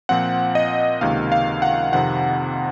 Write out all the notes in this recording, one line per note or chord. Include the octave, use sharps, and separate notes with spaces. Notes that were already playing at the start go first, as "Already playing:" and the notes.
A#2 F3 C4 F#5
D#5
C#2 C3 D#3 A#3 F5
F5
F#5
F2 C3 D#3 F#5